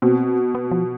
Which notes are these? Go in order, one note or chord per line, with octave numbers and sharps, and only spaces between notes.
B2 C4
B3
F3